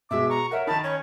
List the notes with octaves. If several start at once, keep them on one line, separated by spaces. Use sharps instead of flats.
B2 G#3 E5 D6
A#5 C#6
A#4 C#5 E5 F#5
D#3 D#4 A5 B5
C#4 C#5